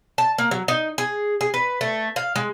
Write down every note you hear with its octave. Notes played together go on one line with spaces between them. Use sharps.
A5
A#3
F#3
D#4
G#4
G#4
B4
A3
F5
G#3